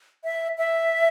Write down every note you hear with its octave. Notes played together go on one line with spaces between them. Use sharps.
E5
E5